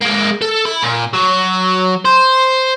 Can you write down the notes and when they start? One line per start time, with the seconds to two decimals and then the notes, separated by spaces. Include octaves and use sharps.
0.01 G#3 A#3
0.42 A4
0.66 E4 B5
0.83 A#2
1.14 F#3
2.05 C5